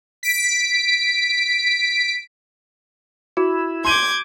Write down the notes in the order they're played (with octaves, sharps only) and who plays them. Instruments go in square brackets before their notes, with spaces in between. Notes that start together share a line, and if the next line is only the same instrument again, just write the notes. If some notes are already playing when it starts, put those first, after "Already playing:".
[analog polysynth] B6 D7
[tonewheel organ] E4 [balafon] F#4
[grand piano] C6 D#7 [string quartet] D6 G6 G#6